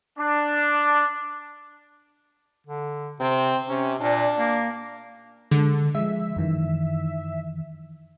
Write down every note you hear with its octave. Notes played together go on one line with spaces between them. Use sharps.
D4
D3
C3 C4
C3 C#4
A#2 D4
A#3
D3 G#3
F3 G#3 E5
F#2 D#3 E3